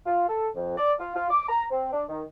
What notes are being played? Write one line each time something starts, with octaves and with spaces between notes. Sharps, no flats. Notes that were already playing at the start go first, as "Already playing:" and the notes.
F4
A4
F2
D5
F4
F4
D6
A#5
C4
D4
D#3